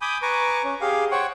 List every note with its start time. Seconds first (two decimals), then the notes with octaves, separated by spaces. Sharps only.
0.01 G#5 B5 D6 D#6 G6
0.22 B4 G#5 A#5 C#6 D6
0.64 C#4
0.81 G4 G#4 F5
1.11 C5 C#5 F#5 G5 C#6